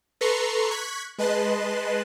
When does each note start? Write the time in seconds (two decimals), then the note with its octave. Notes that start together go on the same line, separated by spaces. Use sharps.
0.21 A4 B4 A#5 C6 C#6 C7
0.70 C#6 F#6 G#6 B6
1.18 G#3 B4 D#5 A5 C6 F#6